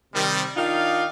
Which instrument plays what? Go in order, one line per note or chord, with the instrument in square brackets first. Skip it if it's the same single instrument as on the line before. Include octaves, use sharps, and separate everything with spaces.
[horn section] C3 D#3 G3
D#3 D4 D#4 F4 D5 F5